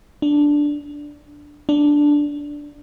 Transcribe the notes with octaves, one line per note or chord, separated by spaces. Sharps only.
D4
D4